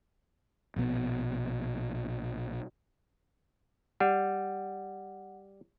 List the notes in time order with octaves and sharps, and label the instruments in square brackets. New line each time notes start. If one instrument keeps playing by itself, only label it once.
[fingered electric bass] A#1 B2 B3
[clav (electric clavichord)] G3 [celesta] F#5